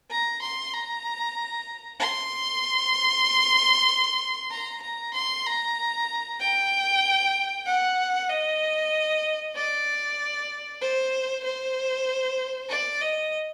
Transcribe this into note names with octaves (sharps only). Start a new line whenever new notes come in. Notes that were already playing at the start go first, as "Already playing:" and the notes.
A#5
C6
A#5
C6
A#5
A#5
C6
A#5
G5
F#5
D#5
D5
C5
C5
D5
D#5